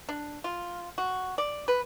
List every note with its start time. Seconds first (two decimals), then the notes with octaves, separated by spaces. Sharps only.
0.09 D4
0.44 F4
0.98 F#4
1.38 D5
1.68 B4